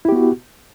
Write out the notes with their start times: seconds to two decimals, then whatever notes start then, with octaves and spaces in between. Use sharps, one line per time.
0.05 E4
0.09 G4
0.12 B3
0.16 F#4